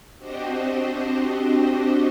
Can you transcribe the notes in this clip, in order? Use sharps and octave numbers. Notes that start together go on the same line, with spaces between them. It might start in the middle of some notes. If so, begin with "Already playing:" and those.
C4 D4 F#4 G4 C5 D#5